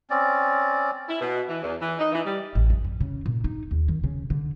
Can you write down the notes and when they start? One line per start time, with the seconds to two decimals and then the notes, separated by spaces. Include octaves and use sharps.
0.10 C4 C#4 D5
1.08 E4
1.21 B2
1.49 E3
1.63 E2
1.81 E3
1.99 D#4
2.12 E3
2.25 G3
2.55 A1
2.70 F2
2.85 F2
3.01 C#3
3.26 A#2
3.44 D#4
3.71 D#2
3.88 D#3
4.04 C#3
4.30 D3